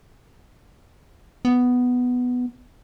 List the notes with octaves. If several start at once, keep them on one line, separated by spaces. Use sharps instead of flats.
B3